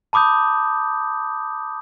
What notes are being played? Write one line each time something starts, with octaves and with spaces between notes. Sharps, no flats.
A5 B5 D6 D#6 G6